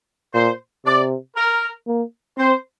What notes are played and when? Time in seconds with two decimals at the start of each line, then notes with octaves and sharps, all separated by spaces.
0.34 A#2 C5
0.86 C3 D5
1.36 A#4
1.87 A#3
2.38 C4 C5